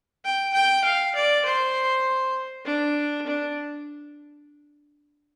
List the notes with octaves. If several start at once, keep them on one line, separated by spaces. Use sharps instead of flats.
G5
G5
F5
D5
C5
D4
D4